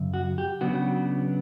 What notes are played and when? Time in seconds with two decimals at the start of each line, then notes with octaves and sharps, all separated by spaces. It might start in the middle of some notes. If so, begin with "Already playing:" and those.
Already playing: F#2 C#3
0.14 F#4
0.38 G4
0.61 C#3 F#3 B3 D4 F#4